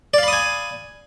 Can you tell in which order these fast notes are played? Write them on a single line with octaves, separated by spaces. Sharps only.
D5 F5 B5 D#6 G#5